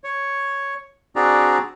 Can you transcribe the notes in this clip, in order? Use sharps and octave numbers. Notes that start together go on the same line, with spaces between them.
C#5
C4 D4 F#4 G#4 D5 A#5